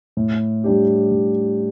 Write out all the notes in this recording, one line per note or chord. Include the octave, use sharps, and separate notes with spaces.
A2
G3 D4 G4
A2